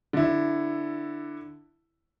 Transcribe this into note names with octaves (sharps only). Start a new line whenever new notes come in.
D3 E4